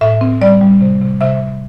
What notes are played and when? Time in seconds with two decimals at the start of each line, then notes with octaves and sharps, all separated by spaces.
0.01 A2 E5
0.21 C4
0.41 G3 D5
0.61 G3
0.81 C3
1.01 C3
1.21 C3 E5
1.40 C3